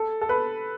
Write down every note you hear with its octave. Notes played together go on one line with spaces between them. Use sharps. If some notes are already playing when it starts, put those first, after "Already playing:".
Already playing: A4
A4
B4